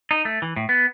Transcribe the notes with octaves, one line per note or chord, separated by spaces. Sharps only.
D#4
A3
E3
A2
B3